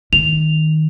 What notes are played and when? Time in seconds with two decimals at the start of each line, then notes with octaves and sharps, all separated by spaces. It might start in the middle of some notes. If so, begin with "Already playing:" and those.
0.13 D#3 F7